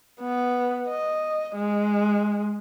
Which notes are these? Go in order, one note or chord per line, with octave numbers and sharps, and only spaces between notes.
B3
D#5
G#3